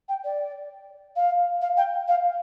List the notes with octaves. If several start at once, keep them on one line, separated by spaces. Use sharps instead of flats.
G5
D5
F5
F5
G5
F5